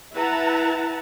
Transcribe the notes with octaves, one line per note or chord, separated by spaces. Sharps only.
E4 B4 E5 F#5 A5 A#5